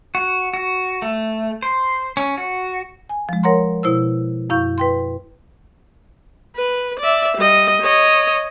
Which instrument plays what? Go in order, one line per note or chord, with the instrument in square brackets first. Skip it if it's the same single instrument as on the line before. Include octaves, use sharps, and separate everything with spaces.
[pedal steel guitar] F#4
F#4
A3
C5
C#4
F#4
[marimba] G#5
F3 G#3
A#4 C#5 F#5 A#5 C6
B2 E4 C5 E6
F#2 E4 F5 C#6 G6
B4 G5 C6
[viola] B4
D5 E5
G3 D#5
C#5 D#5